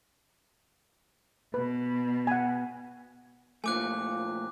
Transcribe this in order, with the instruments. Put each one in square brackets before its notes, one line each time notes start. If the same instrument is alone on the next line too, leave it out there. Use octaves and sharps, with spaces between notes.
[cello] B2 [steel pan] B4
[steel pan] F#5 G#5
[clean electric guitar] A#2 F3 A3 [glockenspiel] G#5 D6 F#6